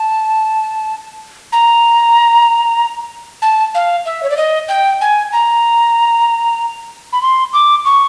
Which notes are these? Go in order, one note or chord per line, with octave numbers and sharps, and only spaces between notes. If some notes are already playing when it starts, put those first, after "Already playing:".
Already playing: A5
A#5
A5
F5
E5
C#5
D5
D#5
G5
G#5
A#5
B5
C6
D6
C#6